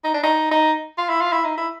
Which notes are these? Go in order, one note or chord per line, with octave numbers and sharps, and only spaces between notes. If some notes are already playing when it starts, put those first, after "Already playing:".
D#4
D4
D#4
D#4
F4
E4
F4
E4
D#4
E4